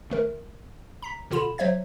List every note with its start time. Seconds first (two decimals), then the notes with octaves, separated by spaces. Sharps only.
0.10 G#1 A3 A#4
1.02 A#5 B6
1.31 B2 D3 F4 B5 E7
1.58 F#3 C5 C#5 E5 G#6